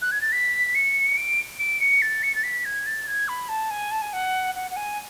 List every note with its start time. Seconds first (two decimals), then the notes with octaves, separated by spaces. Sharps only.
0.02 F#6
0.12 G#6
0.21 A6
0.32 B6
0.75 C#7
1.17 D7
1.59 D7
1.80 C#7
2.02 A6
2.23 C#7
2.35 A6
2.43 B6
2.65 G#6
2.86 A6
3.07 G#6
3.28 B5
3.49 A5
3.71 G#5
3.91 A5
4.02 G#5
4.13 F#5
4.55 F#5
4.71 F#5
4.76 G#5